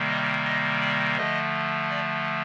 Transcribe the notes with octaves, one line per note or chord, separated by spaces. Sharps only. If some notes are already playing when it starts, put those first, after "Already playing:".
Already playing: C3 D#3 G3 A#3
D#5
D#5
D5
D3 F3 A3 D#5
D5